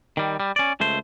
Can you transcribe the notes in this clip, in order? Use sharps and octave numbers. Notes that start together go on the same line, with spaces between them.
D#3 G3
G3
C#4 D5
C#2 A3 C5